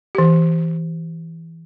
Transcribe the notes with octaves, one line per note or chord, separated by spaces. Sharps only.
E3 G4